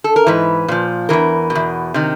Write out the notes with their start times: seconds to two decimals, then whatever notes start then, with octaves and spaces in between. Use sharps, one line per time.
0.04 A4
0.16 A#4
0.27 G#2 E3 B4
0.68 A#2 F3
1.09 C#3 E3 A#4
1.13 E2
1.50 B2
1.55 E2
1.94 C3 D#3